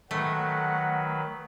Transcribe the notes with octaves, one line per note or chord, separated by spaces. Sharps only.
D#3 F#3 A3 B4 F#5